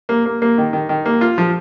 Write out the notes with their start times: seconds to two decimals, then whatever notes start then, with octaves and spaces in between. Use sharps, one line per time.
0.09 A#3
0.25 A#3
0.42 A#3
0.58 D#3
0.73 D#3
0.89 D#3
1.05 A#3
1.21 F4
1.38 F3